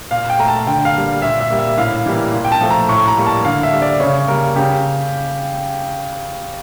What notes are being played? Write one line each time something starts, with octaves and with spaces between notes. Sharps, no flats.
A#2 F5
G5
A3 A#5
A5
D3 G5
F5
G3 A#3
A#2 E5
E5
G3 A#3
E5
A2 F5
E3 G3 A#3
A#2
G5
A5
F3 A3
A#5
A2 C#6
A#5
G3 A#3
A5
D3 F5
E5
G3 A#3
D5
C#3 C#5
G3 A#3 A#4
C#3 G4